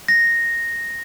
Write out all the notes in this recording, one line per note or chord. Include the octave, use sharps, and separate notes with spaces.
A#6